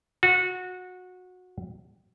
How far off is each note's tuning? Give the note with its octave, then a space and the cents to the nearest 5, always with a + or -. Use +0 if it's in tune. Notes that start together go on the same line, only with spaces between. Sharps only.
F#4 -20